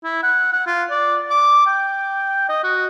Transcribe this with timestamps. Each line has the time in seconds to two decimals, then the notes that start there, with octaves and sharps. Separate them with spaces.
0.04 E4
0.23 F#5
0.53 F#5
0.67 F4
0.91 D5
1.31 D6
1.67 G5
2.49 D#5
2.64 F#4